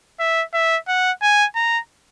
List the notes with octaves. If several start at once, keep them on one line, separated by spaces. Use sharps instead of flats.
E5
E5
F#5
G#5
A#5